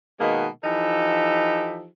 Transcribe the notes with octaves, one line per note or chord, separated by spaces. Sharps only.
B2 D#3 G#3 A#3 B3
E3 F3 D#4 G4 A4